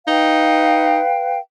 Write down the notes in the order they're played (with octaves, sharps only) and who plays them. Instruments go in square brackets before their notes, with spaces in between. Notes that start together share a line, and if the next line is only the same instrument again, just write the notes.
[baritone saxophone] D#4 [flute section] B4 F5 G5